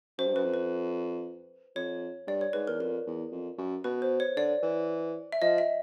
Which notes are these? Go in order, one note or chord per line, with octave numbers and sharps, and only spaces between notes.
F#2 C5
G2
F#2 B4
F2
B4
F2 C#5
G2 D5
C#5
G#2 B4
E2 A#4
F2 A#4
E2
F2
F#2
B2 B4
C5
C#5
D3 D5
E3
E5
F3 D#5
E5